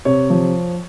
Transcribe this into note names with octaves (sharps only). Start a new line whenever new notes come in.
C3 C#5
F3